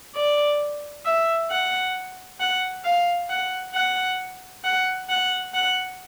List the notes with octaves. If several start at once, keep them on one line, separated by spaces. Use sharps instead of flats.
D5
E5
F#5
F#5
F5
F#5
F#5
F#5
F#5
F#5